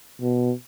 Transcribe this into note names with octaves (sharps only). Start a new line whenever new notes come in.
B2